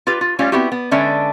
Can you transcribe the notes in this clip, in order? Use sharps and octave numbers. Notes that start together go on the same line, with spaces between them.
F4 G4 B4
F4
G3 A3 C#4 F4 G4
B3 C4 E4 F#4 G4
B3
D3 G#3 C#4 D4 B4 E5